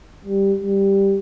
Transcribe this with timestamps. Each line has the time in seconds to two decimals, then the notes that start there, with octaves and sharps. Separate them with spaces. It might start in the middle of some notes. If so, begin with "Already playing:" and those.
0.25 G3
0.63 G3